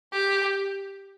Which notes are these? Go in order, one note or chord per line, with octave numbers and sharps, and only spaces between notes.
G4